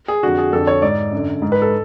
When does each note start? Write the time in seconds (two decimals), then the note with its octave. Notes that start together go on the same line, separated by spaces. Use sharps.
0.08 G#4
0.23 F2 D3 F#4
0.38 G#4
0.53 F2 D3 A4
0.67 C#5
0.82 G#2 D5
1.12 F#2 D3
1.42 G#2
1.52 B4
1.62 A4